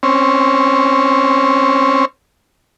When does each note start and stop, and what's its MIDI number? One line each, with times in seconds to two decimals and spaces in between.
0.03 2.05 60
0.03 2.05 61